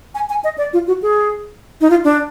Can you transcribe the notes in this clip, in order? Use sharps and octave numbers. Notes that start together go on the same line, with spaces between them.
G#5
G#5
D#5
D5
F4
F#4
G#4
D#4
F4
D4